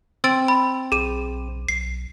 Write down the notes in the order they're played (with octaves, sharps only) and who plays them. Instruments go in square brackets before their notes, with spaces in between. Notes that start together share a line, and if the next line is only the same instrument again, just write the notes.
[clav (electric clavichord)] C4 [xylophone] E6 A6 D7
[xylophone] B5
[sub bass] B1 [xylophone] G#4 D#7
[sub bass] B1 [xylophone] C7